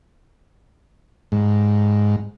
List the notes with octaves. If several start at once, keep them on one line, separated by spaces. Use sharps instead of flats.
G#2